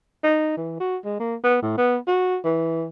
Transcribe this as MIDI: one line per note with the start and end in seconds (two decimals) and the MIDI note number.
0.23 0.56 63
0.57 0.75 52
0.80 0.97 66
1.05 1.19 56
1.19 1.35 58
1.44 1.61 59
1.62 1.75 45
1.78 1.97 59
2.07 2.38 66
2.45 2.85 52